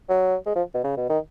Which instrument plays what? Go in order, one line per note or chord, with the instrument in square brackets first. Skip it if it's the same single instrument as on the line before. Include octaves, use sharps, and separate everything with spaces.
[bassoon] F#3
G#3
F3
B2
C#3
B2
D#3